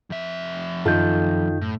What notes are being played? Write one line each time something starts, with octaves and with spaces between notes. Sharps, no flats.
F2 E5
F#2 D#3 F4 A4 G6
A2